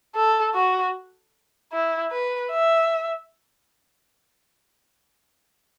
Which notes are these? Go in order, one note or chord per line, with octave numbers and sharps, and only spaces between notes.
A4
F#4
E4
B4
E5